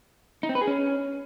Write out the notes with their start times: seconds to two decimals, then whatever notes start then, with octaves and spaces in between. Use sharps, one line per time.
0.43 D#4
0.49 C4
0.55 B4
0.61 G#4
0.67 C#4